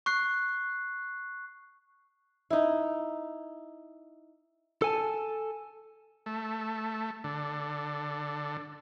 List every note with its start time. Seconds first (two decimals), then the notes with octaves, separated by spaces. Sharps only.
0.06 C#6 F#6 C7
2.50 D#4 E4
4.82 A4 G#5 A5
6.26 A3
7.24 D3